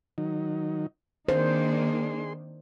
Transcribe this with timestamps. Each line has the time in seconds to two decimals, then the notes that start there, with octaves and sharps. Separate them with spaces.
0.18 D#3 F#3 D#4
1.29 D#3 A#3 D4 G#4 C5 C6